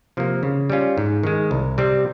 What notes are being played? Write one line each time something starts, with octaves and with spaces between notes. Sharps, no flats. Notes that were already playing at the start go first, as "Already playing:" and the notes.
C3 F3 A#3
C#3
G3 C#4 F4
G#2
D#3 G#3
C2
C3 G3 C4